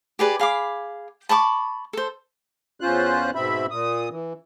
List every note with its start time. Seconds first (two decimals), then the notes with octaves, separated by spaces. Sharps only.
0.19 G4 G#4 B4 D5
0.39 G#4 F5 B5 D6
1.29 A5 B5 C#6 D6
1.93 A4 C5
2.81 E2 C#4 F4 C5 F#6
3.35 G#2 B2 C4 E5 B5
3.70 A#2 D#6
4.11 E3